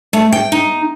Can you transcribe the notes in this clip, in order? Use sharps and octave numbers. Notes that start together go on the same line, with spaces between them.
A3
G5
D#4